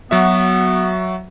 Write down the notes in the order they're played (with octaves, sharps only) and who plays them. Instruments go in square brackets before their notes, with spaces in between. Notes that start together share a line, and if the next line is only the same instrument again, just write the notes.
[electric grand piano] F#3 F#4 E5 [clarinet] B3